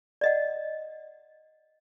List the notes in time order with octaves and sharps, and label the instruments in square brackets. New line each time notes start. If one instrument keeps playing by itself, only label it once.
[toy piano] D5 D#5 F#5